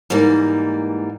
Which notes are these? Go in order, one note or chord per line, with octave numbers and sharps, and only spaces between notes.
G#2 E3 G3 A#3